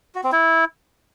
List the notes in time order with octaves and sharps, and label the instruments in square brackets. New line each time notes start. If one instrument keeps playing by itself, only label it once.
[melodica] F#4
C4
E4